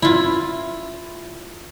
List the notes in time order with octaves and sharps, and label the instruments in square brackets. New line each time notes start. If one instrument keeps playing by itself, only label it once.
[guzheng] E4 F4